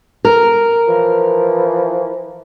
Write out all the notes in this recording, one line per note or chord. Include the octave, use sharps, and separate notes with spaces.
A#4
E3 F3